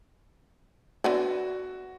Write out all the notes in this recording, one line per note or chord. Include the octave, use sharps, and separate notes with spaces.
D3 B3 E4 F#4